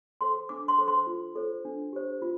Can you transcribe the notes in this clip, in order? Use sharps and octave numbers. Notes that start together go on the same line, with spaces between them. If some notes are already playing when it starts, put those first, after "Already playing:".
A4 C5 C6
D4 D6
C6
A4 C5
C6
F4
A4 C5
D4
G4 C5
F4